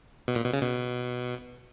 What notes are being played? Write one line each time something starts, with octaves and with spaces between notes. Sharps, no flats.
B2
A#2
B2
C#3
B2